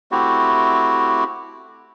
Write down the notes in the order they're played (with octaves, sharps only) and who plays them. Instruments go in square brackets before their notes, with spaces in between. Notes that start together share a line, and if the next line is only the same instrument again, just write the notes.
[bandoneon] A3 C4 E4 F#4 G4